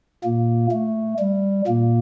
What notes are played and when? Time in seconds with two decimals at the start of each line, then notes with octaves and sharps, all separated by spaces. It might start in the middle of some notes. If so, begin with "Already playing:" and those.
0.24 A#2 A#3
0.72 A3
1.19 G3
1.67 A#2 A#3